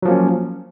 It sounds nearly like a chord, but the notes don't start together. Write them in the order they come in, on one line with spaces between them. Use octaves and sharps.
F#3 F3 A#3 C#4